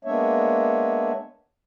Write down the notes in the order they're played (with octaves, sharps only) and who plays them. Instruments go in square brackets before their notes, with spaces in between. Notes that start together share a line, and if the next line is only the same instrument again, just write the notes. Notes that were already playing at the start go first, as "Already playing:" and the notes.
[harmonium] G#3 A#3 B3 D4 C#5 E5